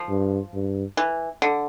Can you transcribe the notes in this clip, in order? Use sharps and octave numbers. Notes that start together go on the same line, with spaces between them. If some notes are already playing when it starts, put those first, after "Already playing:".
Already playing: F3
G2
G2
E3
D3